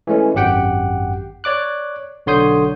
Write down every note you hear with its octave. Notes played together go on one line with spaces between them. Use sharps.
E3 G#3 A3 C#4
G#1 F#2 G4 F#5 G5
C#5 D5 D6 F#6
B1 D3 C#5 C6 D#6 G6